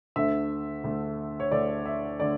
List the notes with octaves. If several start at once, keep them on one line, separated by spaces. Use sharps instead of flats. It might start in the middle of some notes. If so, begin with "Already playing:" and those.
D2 D3 A3 E5
D2 D3 A3
C#5
D2 D3 A3 D5
E5
D3 A3 D5